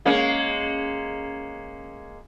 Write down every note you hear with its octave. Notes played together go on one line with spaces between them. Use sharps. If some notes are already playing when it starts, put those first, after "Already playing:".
G#3 A#3 C#4